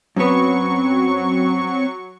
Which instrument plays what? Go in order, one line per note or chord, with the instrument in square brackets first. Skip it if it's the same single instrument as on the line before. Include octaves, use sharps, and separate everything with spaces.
[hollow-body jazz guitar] F#2 B3 [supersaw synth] F#3 C#6 [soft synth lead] C4